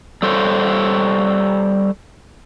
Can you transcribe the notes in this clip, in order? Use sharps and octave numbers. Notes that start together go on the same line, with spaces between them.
G3 A4 C5 C#5